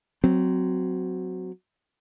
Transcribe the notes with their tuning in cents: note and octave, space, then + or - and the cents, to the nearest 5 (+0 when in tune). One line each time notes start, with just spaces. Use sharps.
F#3 +0 C4 -15